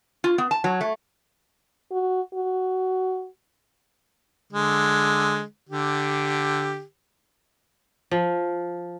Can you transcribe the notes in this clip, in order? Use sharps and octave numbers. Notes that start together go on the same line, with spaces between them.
F4
B3
A5
F#3
A3
F#4
F#4
D3 G#3
D3 G4
F3